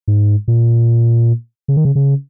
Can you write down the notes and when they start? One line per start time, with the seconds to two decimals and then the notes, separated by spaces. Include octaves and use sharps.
0.08 G#2
0.48 A#2
1.68 C#3
1.76 D#3
1.85 C#3
1.95 C#3